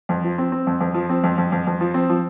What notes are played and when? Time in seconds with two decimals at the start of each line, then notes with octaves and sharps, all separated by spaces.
0.09 F2
0.24 F3
0.38 C4
0.52 C4
0.67 F2
0.81 F2
0.94 F3
1.09 C4
1.24 F2
1.38 F2
1.52 F2
1.67 F2
1.81 F3
1.94 C4
2.09 F3